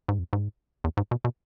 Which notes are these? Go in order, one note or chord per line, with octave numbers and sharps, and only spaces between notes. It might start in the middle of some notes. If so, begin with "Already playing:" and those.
G#2
F2
G#2
E2
G#2
B2
B2